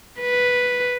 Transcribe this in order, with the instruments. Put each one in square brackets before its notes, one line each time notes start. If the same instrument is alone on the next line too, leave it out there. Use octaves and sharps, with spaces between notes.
[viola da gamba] B4